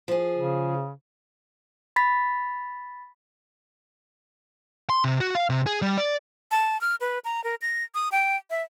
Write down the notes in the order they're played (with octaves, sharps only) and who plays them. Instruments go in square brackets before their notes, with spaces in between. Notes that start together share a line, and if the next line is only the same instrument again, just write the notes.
[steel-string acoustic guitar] F3 G#4
[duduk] C#3
[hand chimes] B5 A6 B6
[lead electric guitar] C6
C3
F#4
F5
C3
G#4
G3
D5
[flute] A5
F6
B4
A#5
A#4
A#6
D#6
G5
E5